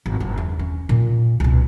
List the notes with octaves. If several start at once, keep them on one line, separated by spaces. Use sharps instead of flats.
G#1
F#1
E2 D3
C#4
A#2
C#2 B2